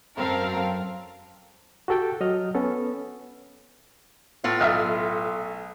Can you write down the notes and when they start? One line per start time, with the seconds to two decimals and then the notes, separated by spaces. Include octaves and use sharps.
0.18 F#2 F#3 C4 A4 A#4 F5
1.88 F#4 G4 A4 G5 A5
2.21 F#3 D#5 F6
2.55 B3 C#4 A4
4.44 A2 A3 B3 F4
4.61 B1 E5 E6 F6